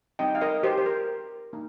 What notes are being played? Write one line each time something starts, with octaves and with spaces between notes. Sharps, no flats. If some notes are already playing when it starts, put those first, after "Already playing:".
G3 C4 D#4 G4 D#5 G5
F5
A#4 D#5
G4 C5
C5
A#4
A#3 D#4